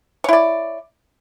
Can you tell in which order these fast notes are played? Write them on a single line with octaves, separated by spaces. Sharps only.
C#5 E4 D5